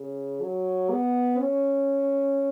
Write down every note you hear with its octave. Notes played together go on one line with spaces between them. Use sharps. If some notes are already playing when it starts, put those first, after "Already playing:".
Already playing: C#3
F#3
B3
C#4